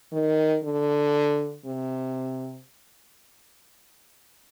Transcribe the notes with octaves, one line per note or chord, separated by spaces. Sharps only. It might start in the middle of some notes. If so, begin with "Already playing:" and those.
D#3
D3
C3